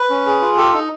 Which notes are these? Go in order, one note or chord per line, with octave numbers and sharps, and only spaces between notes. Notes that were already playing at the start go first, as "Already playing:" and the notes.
Already playing: B4
C#4
G#4
F4
G4 A4
D#4